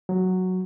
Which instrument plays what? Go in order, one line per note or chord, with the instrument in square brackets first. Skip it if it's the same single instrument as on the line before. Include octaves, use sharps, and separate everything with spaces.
[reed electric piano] F#3